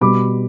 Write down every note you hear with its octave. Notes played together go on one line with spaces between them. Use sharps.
B2 G3 B5 D6